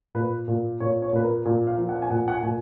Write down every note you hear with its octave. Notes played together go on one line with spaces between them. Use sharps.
A#2 B4
A#2
A#2 C#5
C#5
A#2 B4
A#4
A#2
F5
F3
F#5
G#5
A#2 F#5
F#5
G#5
A#2 G#5